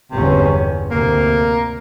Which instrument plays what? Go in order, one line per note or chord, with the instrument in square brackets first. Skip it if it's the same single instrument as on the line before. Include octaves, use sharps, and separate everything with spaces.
[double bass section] G1 E2 C#4 [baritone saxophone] C3
[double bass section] D2 C3 [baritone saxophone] A#3